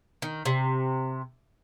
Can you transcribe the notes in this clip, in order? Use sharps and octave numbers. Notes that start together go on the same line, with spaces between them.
D#3
C3